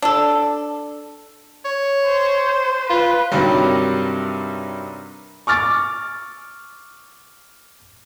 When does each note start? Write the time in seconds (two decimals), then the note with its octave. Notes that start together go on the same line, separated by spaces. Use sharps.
0.02 D4 A4
1.65 C#5
2.06 C5
2.90 F4 B4
3.32 G2 C3 D#3 F#3 G3
5.47 C#6 D6 F6 A6